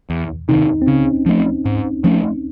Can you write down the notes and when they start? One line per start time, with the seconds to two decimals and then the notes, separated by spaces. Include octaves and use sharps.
0.10 E2
0.49 C3 D#3 D#4
0.82 C4
0.87 C#3 C#4
1.26 F3 A3
1.65 G#2
2.04 F3 A3 C#4